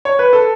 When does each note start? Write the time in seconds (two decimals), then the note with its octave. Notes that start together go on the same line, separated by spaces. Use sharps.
0.05 C#5
0.19 B4
0.33 A4